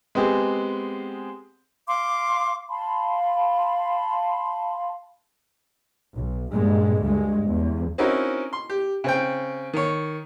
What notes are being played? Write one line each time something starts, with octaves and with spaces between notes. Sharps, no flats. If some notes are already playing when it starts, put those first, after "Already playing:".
G#3 B3 C4 G4 G#4
F5 C6 D6
F5 A5 B5 C6
B1
G2 A#2 G3 G#3
D2 G2 G#3
E2
C4 C#4 D#4 E4 F#4 A#4
C6
G4
C#3 C4 G5
D#3 C#5